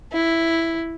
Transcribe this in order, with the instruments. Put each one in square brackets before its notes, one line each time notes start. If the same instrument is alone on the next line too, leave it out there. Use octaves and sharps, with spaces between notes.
[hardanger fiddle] E4